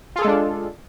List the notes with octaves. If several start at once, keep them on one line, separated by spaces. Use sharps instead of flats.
G#3 D4 F4 G#4 A4